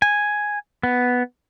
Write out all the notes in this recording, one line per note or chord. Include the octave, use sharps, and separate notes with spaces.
G#5
B3